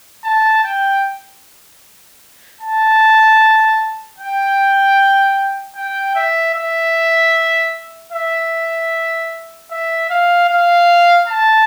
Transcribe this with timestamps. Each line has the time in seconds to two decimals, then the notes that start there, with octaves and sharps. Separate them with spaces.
0.24 A5
0.64 G5
2.61 A5
4.18 G5
5.76 G5
6.15 E5
6.55 E5
8.12 E5
9.70 E5
10.10 F5
10.49 F5
11.28 A5